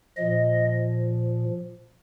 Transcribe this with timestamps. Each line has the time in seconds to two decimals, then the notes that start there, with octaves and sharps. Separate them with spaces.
0.17 A#2 F3 D#5